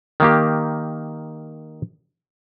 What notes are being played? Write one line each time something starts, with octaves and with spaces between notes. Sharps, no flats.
D#3 A#3 G4